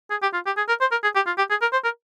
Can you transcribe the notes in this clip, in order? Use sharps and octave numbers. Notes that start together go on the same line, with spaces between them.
G#4
G4
F4
G4
G#4
A#4
C5
A#4
G#4
G4
F4
G4
G#4
A#4
C5
A#4